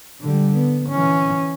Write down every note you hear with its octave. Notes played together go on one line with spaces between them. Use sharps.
D3 G3
B3
E3 C#4